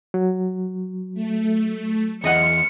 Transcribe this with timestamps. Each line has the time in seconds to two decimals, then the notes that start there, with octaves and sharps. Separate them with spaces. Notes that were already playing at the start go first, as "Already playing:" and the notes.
0.14 F#3
1.14 A3
2.24 E2 D#5 F#5 C6 F6 C#7